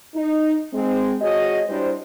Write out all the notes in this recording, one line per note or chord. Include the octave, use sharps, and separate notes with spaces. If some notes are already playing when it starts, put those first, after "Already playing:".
D#4
G#3 C4
F#4 G#4 C#5 D#5
G3 D4 E4 C5